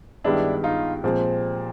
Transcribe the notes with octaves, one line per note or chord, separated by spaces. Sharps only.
G2 D#3 G#3 B3 D4 E4
D#4 F4
A#2 F3 G#3 C4